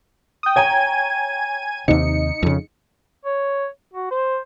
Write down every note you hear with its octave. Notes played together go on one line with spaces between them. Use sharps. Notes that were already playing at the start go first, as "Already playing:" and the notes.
G5 D#6
C#5 G5 G#5 A#5 G#6 D#7
D#2 C3 D#4 C#7
F2 C#3
C#5
F#4
C5